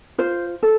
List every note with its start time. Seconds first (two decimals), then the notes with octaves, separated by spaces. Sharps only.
0.18 F4 C5
0.63 A4